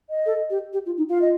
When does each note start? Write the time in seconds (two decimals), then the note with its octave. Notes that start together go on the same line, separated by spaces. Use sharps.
0.10 D#5
0.26 A4
0.50 G4
0.73 G4
0.86 F4
0.98 D#4
1.09 F4 F5
1.21 D#5